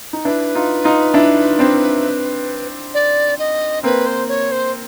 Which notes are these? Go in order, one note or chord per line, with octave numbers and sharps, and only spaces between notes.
D#4
D4 E4 B4
D#4 F4
D#4 F4
D4 E4
C4 D4
D5
D#5
A#3 C4 B4
C5
C#5
C5